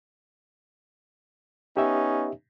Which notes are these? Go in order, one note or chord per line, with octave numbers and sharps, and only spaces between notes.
B3 C#4 D#4 G4 E5